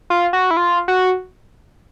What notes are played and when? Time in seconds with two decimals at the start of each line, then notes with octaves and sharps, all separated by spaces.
0.10 F4
0.33 F#4
0.51 E4
0.57 F4
0.88 F#4